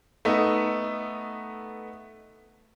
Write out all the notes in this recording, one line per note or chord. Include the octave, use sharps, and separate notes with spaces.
A3 B3 D#4